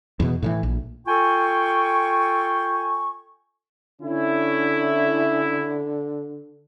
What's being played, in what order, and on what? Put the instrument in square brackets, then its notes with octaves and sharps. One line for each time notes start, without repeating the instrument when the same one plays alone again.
[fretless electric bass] E2 B2
A2 C#3 E3
A#1
[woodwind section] F4 A4 G5 G#5 C#6
[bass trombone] D3 [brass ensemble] C#4 E4